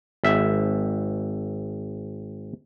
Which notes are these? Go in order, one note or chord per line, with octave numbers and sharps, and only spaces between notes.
G#1 E5